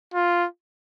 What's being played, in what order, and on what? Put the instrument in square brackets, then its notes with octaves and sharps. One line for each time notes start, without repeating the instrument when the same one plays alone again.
[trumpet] F4